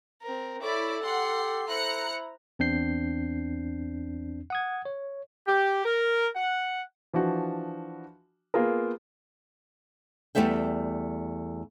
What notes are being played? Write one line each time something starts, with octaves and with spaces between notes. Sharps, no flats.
C4 A#4
E4 A4 C#5 D5 D6
G4 F#5 C6
E4 C5 A#5 F#6 C#7
E2 C4 D4 G6 C7
F#5 D#6 G#6
C#5
G4
A#4
F#5
E3 F3 D4 F#4
A#3 B3 F4 G#4 A#4
E2 F3 G3 A3 E5 G5